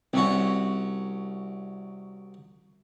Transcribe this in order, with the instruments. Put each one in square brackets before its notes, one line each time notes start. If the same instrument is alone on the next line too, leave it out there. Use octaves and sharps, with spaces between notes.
[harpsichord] C2 C#4 F#4 [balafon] C4